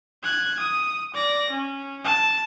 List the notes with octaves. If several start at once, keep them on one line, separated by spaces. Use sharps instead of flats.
F#6 G#6
D#6
D5 A#6
C#4
A5